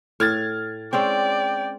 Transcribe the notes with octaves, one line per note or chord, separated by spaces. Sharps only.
A2 F6 G#6 A6
G#3 C4 C#4 D5 G5